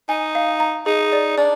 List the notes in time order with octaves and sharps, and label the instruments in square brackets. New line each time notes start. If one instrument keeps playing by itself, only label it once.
[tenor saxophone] D#4 [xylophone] G#5
[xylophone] F5
A#5
[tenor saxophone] D#4 [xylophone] G#4
[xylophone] D5
[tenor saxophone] D4 [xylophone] D5